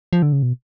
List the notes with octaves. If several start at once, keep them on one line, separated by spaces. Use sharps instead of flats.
F3
D3
C#3
B2